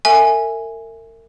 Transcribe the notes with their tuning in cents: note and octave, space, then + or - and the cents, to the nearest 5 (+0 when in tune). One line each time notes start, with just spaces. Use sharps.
A#4 -40 E5 +0 G#5 +0